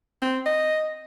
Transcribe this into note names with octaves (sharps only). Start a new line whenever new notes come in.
C4
D#5